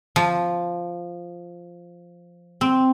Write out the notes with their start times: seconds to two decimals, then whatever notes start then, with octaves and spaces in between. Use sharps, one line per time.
0.16 F3
2.61 C4